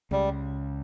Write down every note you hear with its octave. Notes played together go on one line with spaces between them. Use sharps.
C#2 C#3 G3